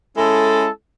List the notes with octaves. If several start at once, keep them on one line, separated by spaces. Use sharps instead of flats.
G#3 C#4 E4 A4